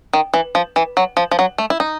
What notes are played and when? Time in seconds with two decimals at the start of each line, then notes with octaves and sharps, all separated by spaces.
0.13 D#3
0.34 E3
0.55 F3
0.76 E3
0.97 F#3
1.17 F3
1.31 F3
1.39 F#3
1.58 A3
1.70 E4
1.80 D#4